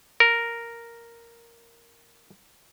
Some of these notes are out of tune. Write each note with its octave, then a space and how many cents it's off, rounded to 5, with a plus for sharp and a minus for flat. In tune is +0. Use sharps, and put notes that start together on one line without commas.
A#4 +0